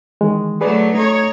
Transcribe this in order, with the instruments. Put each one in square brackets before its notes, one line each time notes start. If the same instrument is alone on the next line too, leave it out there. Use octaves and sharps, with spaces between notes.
[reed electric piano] D#3 E3 G#3
[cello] F#3 A3 [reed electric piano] G#4 B4 D5
[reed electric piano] A3 [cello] D#4 C#5